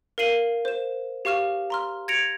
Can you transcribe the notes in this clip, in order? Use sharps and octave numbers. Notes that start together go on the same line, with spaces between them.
A#4 F5 C7 D#7 F#7
C5 E7
G4 F5 C#6 F6 E7
A#5 C6 F6
G#6 A#6 C#7 D7 F7